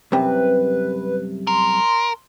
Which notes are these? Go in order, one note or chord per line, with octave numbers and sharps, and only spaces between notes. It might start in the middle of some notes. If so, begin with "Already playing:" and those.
C2 F#2 C3 B4
A#4 C6